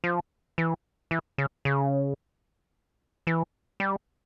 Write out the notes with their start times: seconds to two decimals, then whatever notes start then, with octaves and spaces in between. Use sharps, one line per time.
0.04 F3
0.58 E3
1.11 E3
1.38 C#3
1.65 C#3
3.27 E3
3.80 G3